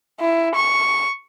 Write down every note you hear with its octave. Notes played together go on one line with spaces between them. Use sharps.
E4
C#6